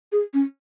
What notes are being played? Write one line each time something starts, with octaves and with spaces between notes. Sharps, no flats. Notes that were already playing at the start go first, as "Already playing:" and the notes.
G#4
C#4